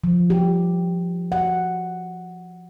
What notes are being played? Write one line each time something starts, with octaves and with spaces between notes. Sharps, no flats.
F3
G4
F#5